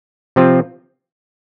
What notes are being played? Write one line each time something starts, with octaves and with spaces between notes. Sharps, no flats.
C3 F3 C4 F4